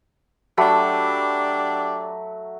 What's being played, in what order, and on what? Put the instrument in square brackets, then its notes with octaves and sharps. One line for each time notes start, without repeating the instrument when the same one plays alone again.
[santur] F#3 A3 B5 [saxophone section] D4 G4 D5